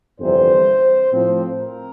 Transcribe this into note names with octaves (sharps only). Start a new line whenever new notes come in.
G1 F2 C3 E3 G3 C5
A2 F3 C4
A#4